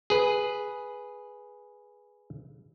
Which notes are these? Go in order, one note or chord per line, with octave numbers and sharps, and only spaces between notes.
G#4 B4